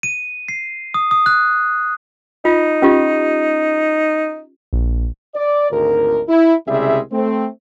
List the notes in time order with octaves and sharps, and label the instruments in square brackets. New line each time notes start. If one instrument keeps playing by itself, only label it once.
[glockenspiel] D#7
C7
D#6
D#6
F#6
[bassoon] D#4 [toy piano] F4
[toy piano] C#4 F4 G4
[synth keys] A#1
[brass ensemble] D5
G#1 D2 A#4
E4
C2 C#3 G3 G#3 G#4 E5
A3 C4